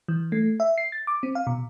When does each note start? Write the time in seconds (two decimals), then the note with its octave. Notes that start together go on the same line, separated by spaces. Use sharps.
0.08 E3
0.32 A3
0.60 E5
0.78 C7
0.92 A6
1.07 D6
1.23 C4
1.35 F5
1.47 B2